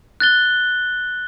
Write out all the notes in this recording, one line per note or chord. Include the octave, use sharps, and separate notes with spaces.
F#6 A6 G7